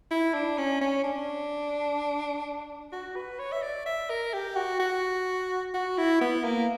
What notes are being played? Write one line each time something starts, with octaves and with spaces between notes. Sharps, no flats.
E4
D4
C#4
C#4
D4
F#4
B4
C#5
E5
D5
E5
A#4
G4
F#4
F#4
F#4
E4
B3
A#3